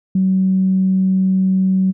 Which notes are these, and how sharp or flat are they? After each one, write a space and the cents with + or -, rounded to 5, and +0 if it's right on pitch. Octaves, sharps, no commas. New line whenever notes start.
F#3 +35